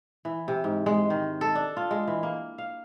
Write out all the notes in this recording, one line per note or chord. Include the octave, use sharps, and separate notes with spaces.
E3
C3
G#2
G#3
D#3
A4
D4
F4
G#3
E3
A#3
F5